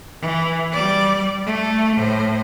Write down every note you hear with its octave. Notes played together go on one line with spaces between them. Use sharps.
E3
G3 D5
A3
A2 C5